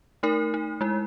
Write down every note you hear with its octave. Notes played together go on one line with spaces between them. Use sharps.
A3 D#4 A#4
D#4
G#3 E4